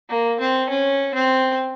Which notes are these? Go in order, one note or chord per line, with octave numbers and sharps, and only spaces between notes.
A#3
C4
C#4
C4